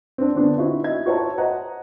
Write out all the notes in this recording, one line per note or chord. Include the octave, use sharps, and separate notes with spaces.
C4 D4
D3 B3 C4 D4
D#4 E4 F#4 E5
D#5 E5 G#6
F#4 C5 C#5 E5 A5 A#5
C5 D#5 F#5 A#5